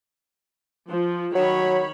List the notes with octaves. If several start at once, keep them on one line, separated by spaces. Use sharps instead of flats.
F3
D#3 F#3 C#5 B5